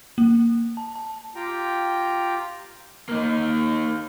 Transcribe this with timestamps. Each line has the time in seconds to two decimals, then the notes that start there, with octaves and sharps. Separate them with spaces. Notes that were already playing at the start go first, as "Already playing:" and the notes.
0.18 A#3
0.77 A5
0.96 A5
1.36 F4 G4 G5 A#5
3.09 A#3 D#4